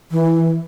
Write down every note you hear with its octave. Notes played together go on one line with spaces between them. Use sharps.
E3